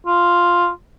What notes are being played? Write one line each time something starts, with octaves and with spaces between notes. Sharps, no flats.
F4